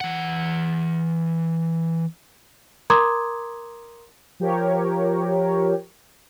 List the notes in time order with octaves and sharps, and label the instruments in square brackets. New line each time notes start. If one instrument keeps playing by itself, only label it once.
[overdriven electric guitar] E3 F#5
[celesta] A#4 A#5 C6 D6 D#6 G#6
[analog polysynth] F3 G4 A#4 C#5